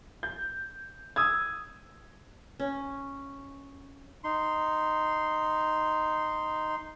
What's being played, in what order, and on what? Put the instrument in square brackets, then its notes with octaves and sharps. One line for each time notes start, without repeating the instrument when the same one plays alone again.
[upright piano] G6
D#6 E6 G#6
[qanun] C#4
[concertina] D#4 C6